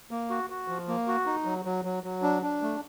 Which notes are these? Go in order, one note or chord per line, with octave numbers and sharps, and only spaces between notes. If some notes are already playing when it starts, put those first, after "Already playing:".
A#3
F#4
F#4
F3
A#3
F#4
D#4
F#3
F#3
F#3
F#3
D4
D4
A3